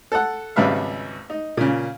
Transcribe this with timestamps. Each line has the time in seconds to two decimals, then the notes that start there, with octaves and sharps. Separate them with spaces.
0.12 A4 F#5
0.56 G#1 C#2 G3 B4 E5 F5
1.30 D#4
1.57 A#2 C#3